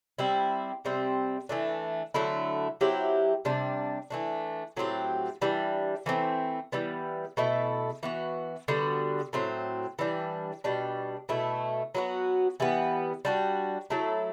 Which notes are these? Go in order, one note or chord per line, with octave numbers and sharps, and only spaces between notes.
G3 C4 E4 G4
C3 G3 C4
E3 A3 D4
D3 F#3 A3 E4
F#3 C4 E4 G4
C3 G3 D4
E3 A3 D4
A2 F#3 C4 G4
E3 G3 D4
E3 A3 C4
E3 G3 B3
B2 A3 E4 A4
E3 B3 F#4
D3 G3 B3 F#4
A2 F#3 C4
E3 G3 D4
B2 G3 D4
B2 A3 E4
F#3 B3 F#4
E3 G3 B3
G3 D4 F#4
F#3 A3 E4 A4